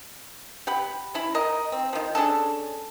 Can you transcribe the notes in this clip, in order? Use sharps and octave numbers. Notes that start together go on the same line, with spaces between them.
G4 F#5 B5
C#4 E4 B5
D#3 A#4 D#5
C4
D#3 F3
C#4 D4 G#4 A4